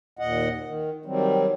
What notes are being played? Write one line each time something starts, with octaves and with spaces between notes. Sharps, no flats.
D#2 A#2 D#5 F#5
D#3
D#3 F#3 G3 C4